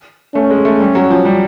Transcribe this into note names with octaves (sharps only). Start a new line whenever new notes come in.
A3 C#4
G#3
A3
G3
F#3
F3
G3